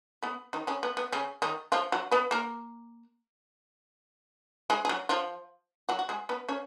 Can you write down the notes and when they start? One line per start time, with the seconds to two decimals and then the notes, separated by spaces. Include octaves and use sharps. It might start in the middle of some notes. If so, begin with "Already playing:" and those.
0.23 B3 B4
0.53 D#3 D#4
0.67 C#3 C#4
0.83 B3
0.97 B3
1.12 C#3 C#4
1.42 D#3 D#4
1.72 F3 F4
1.92 F#3 F#4
2.11 B3 B4
2.31 A#3 A#4
4.70 G#3 G#4
4.85 G#4
4.89 F#3 F#4
5.09 F3 F4
5.89 F#3 F#4
5.99 F#4
6.09 G#3 G#4
6.29 B3 B4
6.49 C#4 C#5